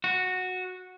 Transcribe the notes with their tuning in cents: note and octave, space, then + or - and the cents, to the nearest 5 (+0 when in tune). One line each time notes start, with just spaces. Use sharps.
F#4 -10